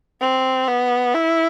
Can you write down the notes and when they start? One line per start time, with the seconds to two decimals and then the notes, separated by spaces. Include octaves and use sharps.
0.20 C4
0.68 B3
1.14 E4